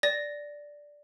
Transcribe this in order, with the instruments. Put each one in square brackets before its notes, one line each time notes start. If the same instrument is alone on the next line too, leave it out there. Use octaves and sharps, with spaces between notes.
[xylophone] D5 A#6